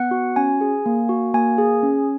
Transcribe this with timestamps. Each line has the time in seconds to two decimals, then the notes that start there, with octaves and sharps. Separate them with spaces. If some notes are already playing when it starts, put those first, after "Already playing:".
Already playing: B3 F#5
0.11 F#4
0.36 C#4 G#5
0.61 G#4
0.86 A#3
1.09 F#4
1.34 A#3 G#5
1.58 G#4
1.83 C#4